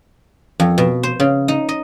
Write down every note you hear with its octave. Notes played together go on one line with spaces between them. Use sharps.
F2
B2
C5
C#3
D#4
D#5